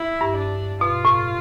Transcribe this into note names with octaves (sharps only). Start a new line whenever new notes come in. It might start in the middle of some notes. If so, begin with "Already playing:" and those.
Already playing: E4
G2
D4
B2 F4
A2